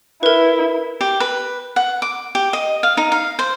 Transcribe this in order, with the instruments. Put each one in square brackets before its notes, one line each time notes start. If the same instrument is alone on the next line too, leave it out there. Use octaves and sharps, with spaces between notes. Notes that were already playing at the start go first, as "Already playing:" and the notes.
[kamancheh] E4 [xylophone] A#4 B4
[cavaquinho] G4
B4
F#5
D6
G4
D#5
F5
D#4
F5
C5